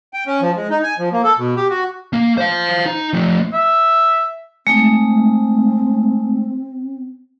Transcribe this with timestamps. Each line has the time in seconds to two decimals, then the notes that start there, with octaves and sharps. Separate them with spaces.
0.13 G5
0.26 C#4
0.41 F3
0.56 G#3
0.70 D#4
0.83 G#5
0.99 F3
1.12 A#3
1.24 A4
1.38 B2
1.57 G4
1.70 F#4
2.13 A#3
2.38 C5 F5
2.86 D#4
3.13 F3 A3
3.53 E5
4.67 G#3 A3 C4 D#4